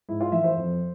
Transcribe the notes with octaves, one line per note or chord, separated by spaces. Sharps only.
G#2 E4
F4
E3 E5
C5
F2